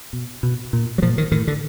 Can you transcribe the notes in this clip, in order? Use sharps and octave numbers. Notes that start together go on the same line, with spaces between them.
B2
B2
A#2
F#3
A#2 F3
D#3
A2 D#3
D3